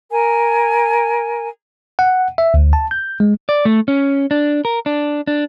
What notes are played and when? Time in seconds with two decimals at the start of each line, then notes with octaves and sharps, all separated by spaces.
0.11 A#4 G#5
1.99 F#5
2.38 E5
2.54 D2
2.73 A5
2.91 G6
3.20 G#3
3.49 D5
3.65 A3
3.88 C#4
4.31 D4
4.65 A#4
4.86 D4
5.27 D4